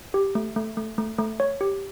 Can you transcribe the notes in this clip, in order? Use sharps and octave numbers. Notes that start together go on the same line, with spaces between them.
G4
A3
A3
A3
A3
A3
C#5
G4